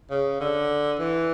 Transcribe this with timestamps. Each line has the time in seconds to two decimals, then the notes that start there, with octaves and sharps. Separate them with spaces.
0.10 C#3
0.40 D3
0.99 E3